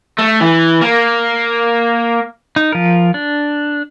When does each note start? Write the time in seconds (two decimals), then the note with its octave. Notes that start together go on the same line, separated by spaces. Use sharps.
0.19 A3
0.41 E3
0.81 A#3
2.56 D#4
2.72 F3 A#4
3.14 D4